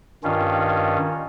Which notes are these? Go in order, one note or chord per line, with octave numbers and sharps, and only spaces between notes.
G2 D#3 C#4 F4